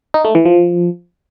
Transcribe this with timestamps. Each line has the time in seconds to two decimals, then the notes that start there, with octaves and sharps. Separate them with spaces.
0.14 D#4
0.25 A3
0.35 E3
0.45 F3